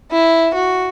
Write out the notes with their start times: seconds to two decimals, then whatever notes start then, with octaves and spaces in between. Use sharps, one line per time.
0.11 E4
0.55 F#4